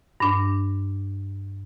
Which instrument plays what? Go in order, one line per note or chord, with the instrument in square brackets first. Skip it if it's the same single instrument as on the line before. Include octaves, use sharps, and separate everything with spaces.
[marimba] G2 D4